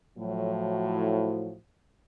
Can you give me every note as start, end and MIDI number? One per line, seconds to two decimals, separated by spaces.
0.18 1.55 45
0.18 1.55 53
0.18 1.55 54